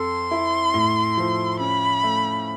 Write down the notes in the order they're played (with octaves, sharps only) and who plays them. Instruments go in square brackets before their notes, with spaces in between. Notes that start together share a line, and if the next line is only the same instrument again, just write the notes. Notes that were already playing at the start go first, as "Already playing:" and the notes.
Already playing: [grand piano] F2 A4 [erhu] C6
[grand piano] E4
A2
F3
[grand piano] C#4 [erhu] B5
[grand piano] A3